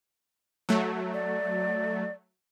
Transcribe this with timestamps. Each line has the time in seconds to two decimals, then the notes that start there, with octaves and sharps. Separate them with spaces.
0.69 F#3 A3
1.13 D5